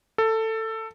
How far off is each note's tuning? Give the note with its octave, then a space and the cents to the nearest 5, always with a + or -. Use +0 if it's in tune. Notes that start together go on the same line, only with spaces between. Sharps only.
A4 +15